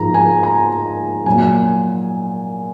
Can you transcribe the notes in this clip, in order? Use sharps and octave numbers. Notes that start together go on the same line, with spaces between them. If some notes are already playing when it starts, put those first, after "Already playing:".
Already playing: G#2 F3 A#5
G#5
A#5
A#2 F#3 G#5